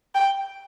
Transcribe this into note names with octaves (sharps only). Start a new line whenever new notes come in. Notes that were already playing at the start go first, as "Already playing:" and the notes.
G5